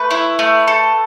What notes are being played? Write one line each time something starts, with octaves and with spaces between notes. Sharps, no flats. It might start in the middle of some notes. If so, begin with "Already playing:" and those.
Already playing: A3 B4
E4
A3
A4